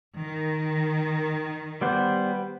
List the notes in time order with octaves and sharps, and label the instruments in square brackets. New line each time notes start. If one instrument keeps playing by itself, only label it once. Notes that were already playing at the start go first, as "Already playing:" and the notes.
[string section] D#3
[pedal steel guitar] G3 B3 C5